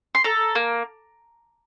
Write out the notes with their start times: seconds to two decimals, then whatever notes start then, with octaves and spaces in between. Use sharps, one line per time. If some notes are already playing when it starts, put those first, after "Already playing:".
0.15 C6
0.24 A4 A#5
0.55 A#3